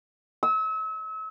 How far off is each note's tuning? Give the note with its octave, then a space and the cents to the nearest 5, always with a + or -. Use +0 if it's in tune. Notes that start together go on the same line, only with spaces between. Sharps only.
E6 -35